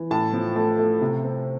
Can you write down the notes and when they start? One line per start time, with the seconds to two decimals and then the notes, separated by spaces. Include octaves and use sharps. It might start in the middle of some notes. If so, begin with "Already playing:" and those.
Already playing: E3
0.11 A2 A5
0.33 F3
0.56 A3 A5
0.79 A3
1.01 C3
1.23 C4